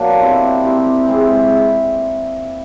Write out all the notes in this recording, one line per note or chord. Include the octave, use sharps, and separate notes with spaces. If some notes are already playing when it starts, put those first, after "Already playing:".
Already playing: B2 F#3 A#3 D4
C4 E4 G4
C4 E4 G4
G#3 C4 E4 G#4